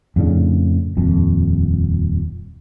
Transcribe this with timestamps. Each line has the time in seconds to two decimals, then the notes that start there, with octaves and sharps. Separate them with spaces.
0.16 F2 A2 C#3 D4
0.97 D#1 F2